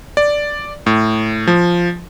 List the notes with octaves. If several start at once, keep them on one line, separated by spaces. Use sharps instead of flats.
D5
A2
F3